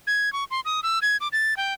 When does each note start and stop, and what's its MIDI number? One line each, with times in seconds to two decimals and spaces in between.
0.07 0.32 92
0.33 0.44 85
0.51 0.60 84
0.65 0.80 87
0.83 0.99 88
1.02 1.17 92
1.21 1.28 86
1.33 1.54 93
1.57 1.74 79